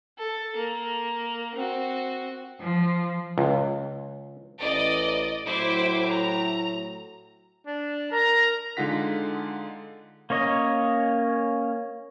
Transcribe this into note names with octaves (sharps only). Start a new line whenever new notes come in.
A4
A#3
C4 F#4
F3
C#2
A1 D5 D#5
A2 F#3 E4 C5 D6
A#5
D4
A#4 A#5
D3 G#3 D#4 F4 F#5 B6
A#3 C#4 C#5 D#5